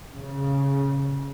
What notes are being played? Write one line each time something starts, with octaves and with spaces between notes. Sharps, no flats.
C#3